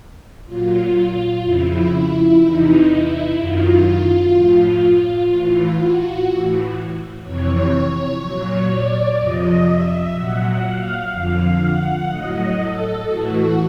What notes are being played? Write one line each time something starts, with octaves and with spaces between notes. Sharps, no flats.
A#2 F#3 F4
F2 C#3 F3 E4
E2 C3 E3 D#4
E4
F#2 D#3 F#3 F4
A2 F3
F4
A2 E3
F#4
A2 E3
F2 C3 E3 C#5
A#2 F#3
D5
F2 C3 F3 D#5
E5
A#2 F#3 F#5
F5
F2 D3 F3
F#5
A2 F#3 D#5
A4
A2 E3 F#4